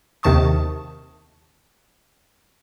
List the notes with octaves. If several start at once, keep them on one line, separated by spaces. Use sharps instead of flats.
D#2 C3 D#3 A5 C#6 D#6